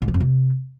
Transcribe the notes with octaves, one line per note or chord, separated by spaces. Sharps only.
G#2
F3
F2
C3